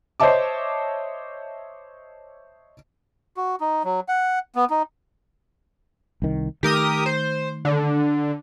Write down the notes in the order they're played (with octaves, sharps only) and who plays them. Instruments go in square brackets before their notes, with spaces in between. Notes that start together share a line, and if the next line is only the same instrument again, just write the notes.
[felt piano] C5 C#5 D#5 E5 A5 D6
[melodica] F#4
D#4
F#3
F#5
B3
D#4
[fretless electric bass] C2 D#3
[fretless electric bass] D#3 A3 [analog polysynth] G4 A#4 D#6
[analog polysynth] C5
D3